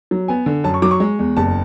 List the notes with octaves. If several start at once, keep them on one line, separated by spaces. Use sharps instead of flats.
F#3
B3 G#5
D3
F#2 A5
C#6
F#3 D6
C#6
G#3
E2
F#1 A5